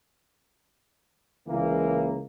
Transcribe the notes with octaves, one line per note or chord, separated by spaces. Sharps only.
C#2 E3 A#3